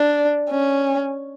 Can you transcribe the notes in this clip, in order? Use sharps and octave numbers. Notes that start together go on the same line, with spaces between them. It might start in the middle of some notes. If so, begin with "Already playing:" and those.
Already playing: D4
C#4